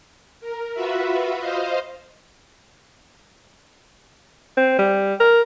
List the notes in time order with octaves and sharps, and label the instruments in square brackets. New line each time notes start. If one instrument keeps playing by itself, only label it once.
[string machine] A#4
F4 F#4 B4 E5 B5
C5 D#5 F5
[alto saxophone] C4
G3
A#4